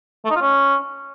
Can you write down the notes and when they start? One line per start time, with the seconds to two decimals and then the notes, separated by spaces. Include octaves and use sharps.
0.25 A3
0.30 D#4
0.36 F4
0.41 C#4